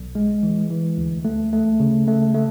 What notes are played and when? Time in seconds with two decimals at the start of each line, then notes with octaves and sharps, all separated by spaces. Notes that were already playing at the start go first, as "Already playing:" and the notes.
Already playing: B1
0.15 G#3
0.43 E3
0.71 E3
0.98 D2
1.25 A3
1.53 A3
1.80 C#3
2.08 A3
2.35 A3